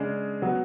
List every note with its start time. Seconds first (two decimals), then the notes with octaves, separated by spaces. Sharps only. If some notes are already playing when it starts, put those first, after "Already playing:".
Already playing: C#3 G#3 D4 G#4
0.42 F#3 B3 F#4